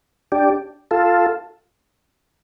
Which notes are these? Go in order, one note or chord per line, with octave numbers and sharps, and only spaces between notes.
D4 G4
F4 A4